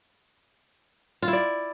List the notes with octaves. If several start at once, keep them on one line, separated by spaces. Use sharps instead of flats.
F4
E4
D5